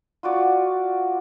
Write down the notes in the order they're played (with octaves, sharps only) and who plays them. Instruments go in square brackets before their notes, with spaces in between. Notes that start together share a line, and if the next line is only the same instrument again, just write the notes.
[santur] F4 F#4 D5